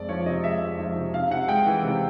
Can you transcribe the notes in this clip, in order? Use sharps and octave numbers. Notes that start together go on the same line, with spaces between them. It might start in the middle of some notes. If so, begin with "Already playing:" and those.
Already playing: F2 G#3 D5
F3 C#5
C3 D#5
G#3 E5
F2
F3
C3
C3 F5
C3 F#5
G#3 G5
E3
C3